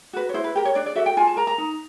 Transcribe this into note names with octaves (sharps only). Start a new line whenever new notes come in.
F#4 B4
C#5
E4 C5
B4
G4 A#4
C#5
D4 D5
D5
F#4 A4 E5
G5
F4 G#5
A5
A#4 A#5
A#5
D#4